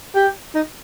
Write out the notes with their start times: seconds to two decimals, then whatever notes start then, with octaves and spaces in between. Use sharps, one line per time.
0.15 G4
0.55 D#4